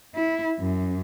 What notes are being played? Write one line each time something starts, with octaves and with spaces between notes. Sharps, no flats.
E4
F#2